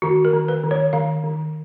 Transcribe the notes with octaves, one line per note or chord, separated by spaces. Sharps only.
D#3 F#4
A#4
D#3
B4
D#3
C#5
D#3 F5
D#3